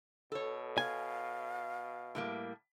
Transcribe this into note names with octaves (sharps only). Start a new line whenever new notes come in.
B2 A4 C#5
F5 G#5
A2 G3 A#3